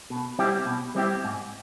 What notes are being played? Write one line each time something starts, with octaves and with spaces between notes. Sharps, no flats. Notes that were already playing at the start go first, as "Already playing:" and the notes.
B2
G3 C4 E4 G4
B2
G3 C4 E4 G4
G#2